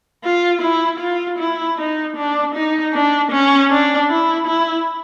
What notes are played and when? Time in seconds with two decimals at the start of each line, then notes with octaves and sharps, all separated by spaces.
0.24 F4
0.62 E4
1.00 F4
1.39 E4
1.78 D#4
2.17 D4
2.55 D#4
2.94 D4
3.32 C#4
3.71 D4
4.10 E4
4.47 E4